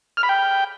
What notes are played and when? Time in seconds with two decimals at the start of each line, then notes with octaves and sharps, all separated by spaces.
0.17 F6
0.23 B5
0.29 G5